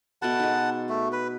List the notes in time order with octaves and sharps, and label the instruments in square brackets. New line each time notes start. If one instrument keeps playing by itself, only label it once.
[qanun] B2 A3 B3 [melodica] F#5 A5
[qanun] G#3 D#4
[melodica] A3
B4